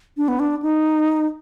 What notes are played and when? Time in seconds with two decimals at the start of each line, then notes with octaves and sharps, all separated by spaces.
0.17 D4
0.28 B3
0.39 D4
0.63 D#4